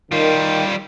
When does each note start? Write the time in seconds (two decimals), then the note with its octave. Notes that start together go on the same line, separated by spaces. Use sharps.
0.12 D#3 G3 F4